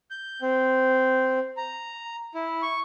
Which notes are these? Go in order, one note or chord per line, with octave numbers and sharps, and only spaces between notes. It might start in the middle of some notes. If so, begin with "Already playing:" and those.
G6
C4
A#5
E4
C#6